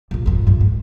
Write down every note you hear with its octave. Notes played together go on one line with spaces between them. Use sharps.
A#1 E2
G#1 F2
A#1 G2
G#2